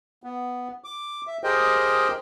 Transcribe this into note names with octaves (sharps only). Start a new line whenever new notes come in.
B3
D6
E5
G4 G#4 A#4 C5 D#5 G5